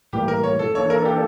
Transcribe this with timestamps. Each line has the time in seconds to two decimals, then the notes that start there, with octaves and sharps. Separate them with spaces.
0.13 A2 E3 G3 A#3 G4
0.28 A#4
0.43 C#5
0.59 A4
0.74 E3 A#3 D4 A4 C#5
0.90 A#4
1.05 G4